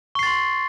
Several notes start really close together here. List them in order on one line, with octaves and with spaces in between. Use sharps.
C#6 C7 A6 C6